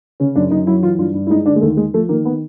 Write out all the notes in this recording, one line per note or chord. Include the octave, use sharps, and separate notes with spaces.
C#3 C#4
F#2 D4
F#2 D#4
F#3 E4
E3 F4
G2 F4
G2
E4
G#3 D#4
D3 D4
G#3
D#2 A3
G#3
F3 A3
D#3 A#3
B3